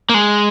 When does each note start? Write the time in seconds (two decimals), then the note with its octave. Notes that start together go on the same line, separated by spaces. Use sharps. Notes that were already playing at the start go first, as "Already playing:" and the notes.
0.09 A#3
0.14 G#3